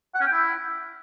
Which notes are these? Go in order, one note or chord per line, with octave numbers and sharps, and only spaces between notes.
F#5
C#4
G5
E4